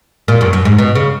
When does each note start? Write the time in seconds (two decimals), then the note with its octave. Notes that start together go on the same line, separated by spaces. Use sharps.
0.28 A#2
0.41 F#2
0.53 F#2
0.65 G#2
0.78 B2
0.95 C#3